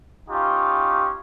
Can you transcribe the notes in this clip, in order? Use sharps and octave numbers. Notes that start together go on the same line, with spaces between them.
C#4 D#4 F4 G4